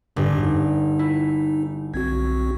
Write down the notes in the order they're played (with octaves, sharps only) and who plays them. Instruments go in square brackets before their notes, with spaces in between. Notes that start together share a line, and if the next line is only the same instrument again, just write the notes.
[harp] G1 [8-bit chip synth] F2 G#2 G4
[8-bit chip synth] D#4
[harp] E4
[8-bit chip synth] B1 C4 F#4 [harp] G#6